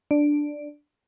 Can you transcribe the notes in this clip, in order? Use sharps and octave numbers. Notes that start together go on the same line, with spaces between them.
D4